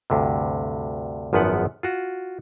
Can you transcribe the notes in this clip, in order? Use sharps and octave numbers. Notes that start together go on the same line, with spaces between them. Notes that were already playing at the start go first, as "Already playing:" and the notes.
D2 G2 C3
G#1 F#2 F3 B3 B4 F#5
F4 F#4